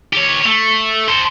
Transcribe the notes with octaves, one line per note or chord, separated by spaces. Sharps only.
G4 C#5
A3
A4 C5